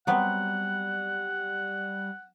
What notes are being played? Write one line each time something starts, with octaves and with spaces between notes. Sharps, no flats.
F#3 G3 B3 C4 F#5